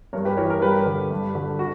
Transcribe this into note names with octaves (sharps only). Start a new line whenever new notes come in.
G2 A#4 C#5
G4 B4
E3 A#4 C#5
A#4 C#5
G2 G4 B4
D3
G2
D3
F#4